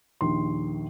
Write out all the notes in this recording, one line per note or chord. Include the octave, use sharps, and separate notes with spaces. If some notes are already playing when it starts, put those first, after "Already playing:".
A#1 D#2 C6